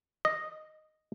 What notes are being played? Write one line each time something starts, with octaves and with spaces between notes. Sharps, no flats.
D#5